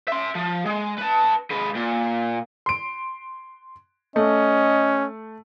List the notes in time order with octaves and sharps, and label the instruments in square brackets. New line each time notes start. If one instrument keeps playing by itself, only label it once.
[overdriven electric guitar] E5 C6
F3
G#3
B4 A5
G#3 B4
A#2
[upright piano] C6 D7
[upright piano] A3 [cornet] C#4 [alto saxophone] D#5